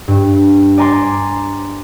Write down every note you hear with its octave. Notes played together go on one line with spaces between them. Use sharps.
G2
D5 G#5 A#5 C6